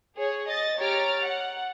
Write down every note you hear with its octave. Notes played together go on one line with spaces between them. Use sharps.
G#4 C#5
D#5 A6
G4 C#5 A#5 F6 A6 D7
F#5